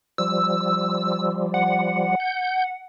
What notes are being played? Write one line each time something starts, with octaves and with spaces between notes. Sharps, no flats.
F3 G3 E6
F#5
G6